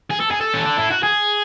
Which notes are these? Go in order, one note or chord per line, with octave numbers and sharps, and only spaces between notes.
G#4
A4
G#4
A4
C#4
D4
E4
F#4
G#4